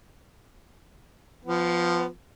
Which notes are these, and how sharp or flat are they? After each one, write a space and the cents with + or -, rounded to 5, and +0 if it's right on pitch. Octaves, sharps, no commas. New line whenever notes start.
F3 +0 B3 +25